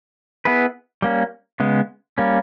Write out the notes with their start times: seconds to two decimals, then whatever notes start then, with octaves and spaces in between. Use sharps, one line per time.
0.45 B3 E4 G#4 B4
1.02 G3 A#3 C#4
1.60 C#3 G#3 B3
2.18 G3 A#3 C#4